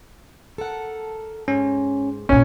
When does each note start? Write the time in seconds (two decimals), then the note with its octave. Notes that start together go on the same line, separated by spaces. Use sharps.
0.58 A4 A#4 F#5
1.48 G#2 C#4
2.29 C#2 A#2 C#4 D#4 G#5